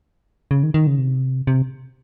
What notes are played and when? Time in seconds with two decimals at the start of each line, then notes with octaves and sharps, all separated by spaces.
0.51 C#3
0.63 D#3
0.74 D#3
0.87 C#3
0.98 C3
1.47 C3